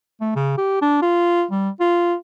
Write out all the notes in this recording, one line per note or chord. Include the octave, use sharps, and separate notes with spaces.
A3
C#3
G4
D4
F4
G3
F4